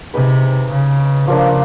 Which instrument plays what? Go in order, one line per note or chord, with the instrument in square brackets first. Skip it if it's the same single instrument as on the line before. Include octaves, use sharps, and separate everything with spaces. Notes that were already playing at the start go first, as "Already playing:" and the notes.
[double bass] C3 [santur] D#4 G#4 B4
[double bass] C#3
[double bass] C#3 [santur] F3 A#3 D4